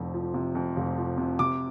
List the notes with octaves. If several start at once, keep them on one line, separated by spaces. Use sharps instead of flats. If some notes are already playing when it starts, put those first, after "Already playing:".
Already playing: F1 F2
F3
C3
F2
F1
F3
C3
C3 D6